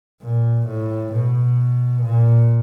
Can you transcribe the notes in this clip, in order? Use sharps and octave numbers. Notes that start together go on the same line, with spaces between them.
A#2
A2
B2
A#2